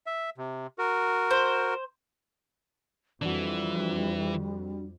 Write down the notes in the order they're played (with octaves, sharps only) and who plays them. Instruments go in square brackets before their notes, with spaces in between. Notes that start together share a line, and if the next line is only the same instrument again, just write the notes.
[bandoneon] E5
C3
F#4 A#4
[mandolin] C5
[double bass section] F2 [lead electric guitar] E3 [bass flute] G3 [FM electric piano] D4 F#4